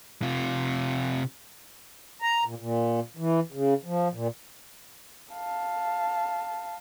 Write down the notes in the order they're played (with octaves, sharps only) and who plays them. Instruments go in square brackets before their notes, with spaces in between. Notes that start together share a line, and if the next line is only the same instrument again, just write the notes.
[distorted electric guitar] C3 F4
[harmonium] A#5
A#2
A#2
E3
C#3
F3
A#2
[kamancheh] F5 A5